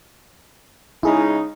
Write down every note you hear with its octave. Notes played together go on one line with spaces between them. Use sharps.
C#3 G#3 D#4 E4 G#4